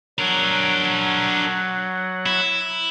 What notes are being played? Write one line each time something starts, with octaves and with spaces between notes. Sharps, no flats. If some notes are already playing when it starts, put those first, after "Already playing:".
F#3 D4 A#4 F#5
E4